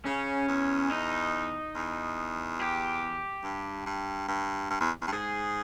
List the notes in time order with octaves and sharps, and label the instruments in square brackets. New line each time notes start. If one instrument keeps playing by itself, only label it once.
[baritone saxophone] C#3 [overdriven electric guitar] C#4
[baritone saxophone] E2
[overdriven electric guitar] D#4
[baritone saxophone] E2
[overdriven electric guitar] G4
[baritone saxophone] G2
G2
G2
G2
E2
E2
G2
[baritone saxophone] G#2 [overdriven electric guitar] G#4